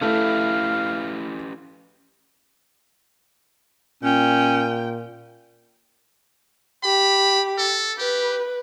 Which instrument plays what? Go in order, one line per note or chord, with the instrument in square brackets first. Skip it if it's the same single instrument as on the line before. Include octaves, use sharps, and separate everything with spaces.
[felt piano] A3 E4 [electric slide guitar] C#4 G4 B4 [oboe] F5
[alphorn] A#2 [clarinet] C#4 [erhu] G5
[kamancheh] G4 [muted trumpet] B5
[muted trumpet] A4
[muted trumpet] G4 [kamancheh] B4